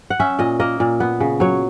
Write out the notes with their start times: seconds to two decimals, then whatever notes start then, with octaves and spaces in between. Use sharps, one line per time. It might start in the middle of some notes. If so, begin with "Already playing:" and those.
0.10 F#5
0.20 C#4 E5
0.39 A#2 D#5
0.60 A#3 D#5
0.80 A#2
1.00 B3
1.20 C#3
1.40 F#3 C#5